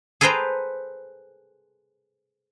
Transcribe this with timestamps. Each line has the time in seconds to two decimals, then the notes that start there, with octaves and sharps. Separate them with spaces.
0.21 G#4 A4 B4 C5 G5 A#5